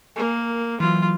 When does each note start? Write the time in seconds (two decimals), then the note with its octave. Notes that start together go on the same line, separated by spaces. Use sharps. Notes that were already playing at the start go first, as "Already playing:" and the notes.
0.16 A#3 A#4 G#5
0.80 E3 F#3 F4